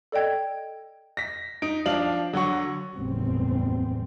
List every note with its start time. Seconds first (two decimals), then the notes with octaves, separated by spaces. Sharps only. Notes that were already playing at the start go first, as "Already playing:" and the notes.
0.12 A4 D5 D#5 G5 G#6
1.17 A#6 B6
1.62 D#4 D7
1.86 F3 D4 F5 F#7
2.33 D3 F#3 F#5 C#6
2.95 F#1 E2 A2 C#3 G3 C4